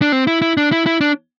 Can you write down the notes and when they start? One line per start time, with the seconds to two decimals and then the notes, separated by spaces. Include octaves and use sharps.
0.02 D4
0.12 C4
0.27 E4
0.42 E4
0.57 D4
0.72 E4
0.86 E4
1.01 D4